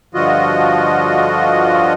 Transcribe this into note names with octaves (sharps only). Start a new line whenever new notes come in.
G2 D3 F3 F4 F#4 D#5